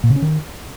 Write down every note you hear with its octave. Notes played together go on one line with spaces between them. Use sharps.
A#2
C#3
C#4
D#3